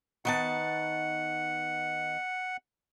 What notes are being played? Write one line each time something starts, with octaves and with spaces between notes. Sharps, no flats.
D#3 B3 F#5 A5